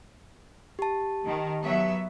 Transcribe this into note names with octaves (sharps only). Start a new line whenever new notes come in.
G4 A5
D#3
F#3 B3 E5